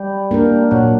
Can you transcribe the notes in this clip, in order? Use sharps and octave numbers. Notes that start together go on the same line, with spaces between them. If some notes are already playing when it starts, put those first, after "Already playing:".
Already playing: G3
A#3 D4 A#4
A#2 F#3